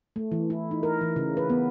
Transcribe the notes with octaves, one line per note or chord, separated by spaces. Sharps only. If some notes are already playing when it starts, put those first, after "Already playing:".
A3
E3
E4
D#4
A#4
E3
C#3
B4
B3